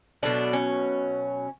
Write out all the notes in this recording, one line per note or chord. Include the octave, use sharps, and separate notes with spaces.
B2 F#3 A3 D4
C#4